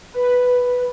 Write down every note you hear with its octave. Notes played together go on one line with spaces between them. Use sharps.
B4